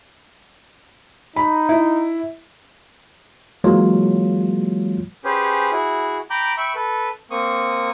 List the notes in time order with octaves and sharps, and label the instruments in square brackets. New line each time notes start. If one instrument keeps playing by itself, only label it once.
[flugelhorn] D#4 [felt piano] B5
[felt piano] E4
[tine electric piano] E3 F#3 G#3 A#3 F4 C#5
[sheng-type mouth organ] C#4 G4 G#4 B4 C5
E4 F#4 G#4
G5 A#5 B5 D6 G6
E5 G5 B5 C#6 E6
A4 B4
A#3 C4 C#6 D#6